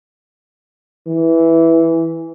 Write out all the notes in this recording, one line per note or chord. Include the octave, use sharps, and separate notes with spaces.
E3